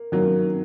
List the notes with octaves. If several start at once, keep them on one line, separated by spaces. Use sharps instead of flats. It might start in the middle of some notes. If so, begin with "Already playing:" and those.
Already playing: A#3
D#3 F#3 A#3